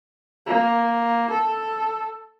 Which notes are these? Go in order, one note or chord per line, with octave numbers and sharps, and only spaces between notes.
A#3
A4